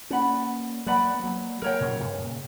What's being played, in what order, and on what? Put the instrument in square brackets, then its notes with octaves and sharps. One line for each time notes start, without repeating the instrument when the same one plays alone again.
[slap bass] A#3 C#4 [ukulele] B4 D5 F#5 B5
[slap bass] F#3 A#3 [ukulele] B4 D5 F#5 B5
[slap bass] B3
F#3 A#3
[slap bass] F#3 A#3 [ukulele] A#4 C#5 G5
[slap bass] A#2 C#3
G2 B2
A#2 C#3